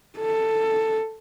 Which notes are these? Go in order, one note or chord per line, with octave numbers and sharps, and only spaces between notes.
A4